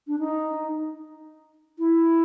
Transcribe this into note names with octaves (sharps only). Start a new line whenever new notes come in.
D4
D#4
E4